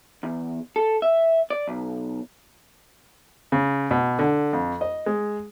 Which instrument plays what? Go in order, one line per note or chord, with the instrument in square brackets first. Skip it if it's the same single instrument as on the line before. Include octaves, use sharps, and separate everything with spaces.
[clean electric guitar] E2
A4
E5
D5
B1
[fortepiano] C#3
B2
D3
F2
D#5
G#3